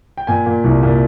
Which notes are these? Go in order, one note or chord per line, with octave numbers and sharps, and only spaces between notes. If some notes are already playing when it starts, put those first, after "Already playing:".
G5
A#2 G#5
A#2
C2
A#2